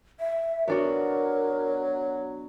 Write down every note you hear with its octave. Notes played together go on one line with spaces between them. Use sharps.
E5
F#3 B3 D4 F#4 A#4